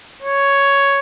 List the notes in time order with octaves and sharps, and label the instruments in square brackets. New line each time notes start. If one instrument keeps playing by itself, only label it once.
[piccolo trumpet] C#5